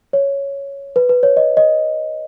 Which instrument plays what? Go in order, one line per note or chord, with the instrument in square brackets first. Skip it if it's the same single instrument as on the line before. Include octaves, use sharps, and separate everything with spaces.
[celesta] C#5
B4
B4
C#5
D#5
D#5